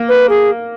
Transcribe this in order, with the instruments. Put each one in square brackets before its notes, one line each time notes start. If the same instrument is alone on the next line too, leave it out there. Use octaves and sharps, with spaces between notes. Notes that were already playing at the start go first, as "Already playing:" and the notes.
Already playing: [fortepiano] A#3
[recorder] B4
G#4